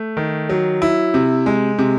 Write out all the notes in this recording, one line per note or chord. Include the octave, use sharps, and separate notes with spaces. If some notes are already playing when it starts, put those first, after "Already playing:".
Already playing: A3
D#3
F#3
E4
C3
G#3
C3